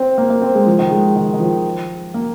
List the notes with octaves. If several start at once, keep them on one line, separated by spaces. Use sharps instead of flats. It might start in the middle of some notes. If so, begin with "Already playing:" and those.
Already playing: C4
A#3
A#3
C4
G#3
F3
D#3
G#3
D#3
D#3
F3
A#3